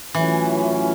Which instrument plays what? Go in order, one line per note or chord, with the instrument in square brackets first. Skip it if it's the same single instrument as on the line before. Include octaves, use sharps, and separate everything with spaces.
[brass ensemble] A2 F#3 A3 C#4 F4 [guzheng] E3